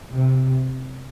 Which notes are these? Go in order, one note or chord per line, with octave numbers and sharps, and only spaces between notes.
C3